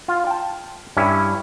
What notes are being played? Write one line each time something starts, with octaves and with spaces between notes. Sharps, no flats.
F4
G5 A5
G2 C#4 E4